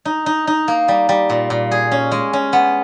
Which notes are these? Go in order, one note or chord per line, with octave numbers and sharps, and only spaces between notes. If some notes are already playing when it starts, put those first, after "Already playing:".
D#4
D#4
D#4
A#3
G3
G3
A#2
A#2
G#4
C#4
G#3
C#4
B3